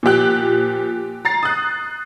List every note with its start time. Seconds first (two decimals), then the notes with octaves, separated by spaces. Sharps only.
0.03 A#2 F3 G4 F#6
1.25 A#5 A6 C7
1.43 D#6 F#6